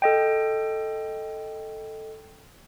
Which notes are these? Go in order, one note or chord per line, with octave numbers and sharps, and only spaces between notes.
A4 D#5 G5